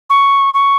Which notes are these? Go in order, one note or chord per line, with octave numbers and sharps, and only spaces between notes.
C#6
C#6